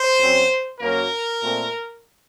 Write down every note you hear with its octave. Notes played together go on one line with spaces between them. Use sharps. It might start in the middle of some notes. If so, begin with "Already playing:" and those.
Already playing: C5
F#2 F#3 C4
F#2 F#3 A#3 A#4
A#2 A3 C4